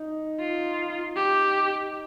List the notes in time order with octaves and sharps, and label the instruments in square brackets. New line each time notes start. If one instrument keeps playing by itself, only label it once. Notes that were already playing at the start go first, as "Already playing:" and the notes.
Already playing: [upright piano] D#4
[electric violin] F4
G4